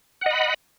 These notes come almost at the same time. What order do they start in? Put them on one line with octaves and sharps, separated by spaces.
F#5 D#5 B5